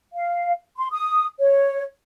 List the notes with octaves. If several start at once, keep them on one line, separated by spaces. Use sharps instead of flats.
F5
C6
D#6
C#5